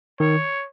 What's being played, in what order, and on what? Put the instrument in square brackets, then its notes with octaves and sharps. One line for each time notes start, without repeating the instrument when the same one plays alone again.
[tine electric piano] D#3 [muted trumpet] C#5